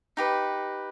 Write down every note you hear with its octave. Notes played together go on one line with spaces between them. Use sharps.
D#4 G4 B4